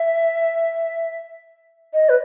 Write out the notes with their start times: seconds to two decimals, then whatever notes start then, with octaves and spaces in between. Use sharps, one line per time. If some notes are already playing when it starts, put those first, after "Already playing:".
Already playing: E5
1.93 D#5
2.09 B4